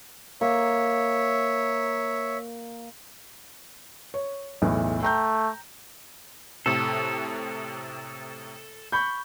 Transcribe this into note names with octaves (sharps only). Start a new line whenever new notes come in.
A#3 C#5 E5
C#5
B1 E2 A2
A3 G5 A#5 G6
A2 C3 A4
B5 C#6 G6